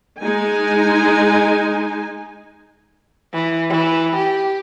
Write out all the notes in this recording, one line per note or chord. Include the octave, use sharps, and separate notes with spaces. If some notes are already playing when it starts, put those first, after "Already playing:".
G#3 D#4 G#5
E3
E3
G4